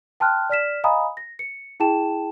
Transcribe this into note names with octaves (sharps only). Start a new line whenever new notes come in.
G5 A5 C6 F6 F#6
D5 F6 B6 E7
D#5 F5 G#5 A#5 B5 D#6
A#6
C#7
E4 G#4 G5 A5 E7